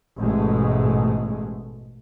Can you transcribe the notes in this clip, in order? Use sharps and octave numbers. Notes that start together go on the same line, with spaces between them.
A1 G#2 B2 G#3 A3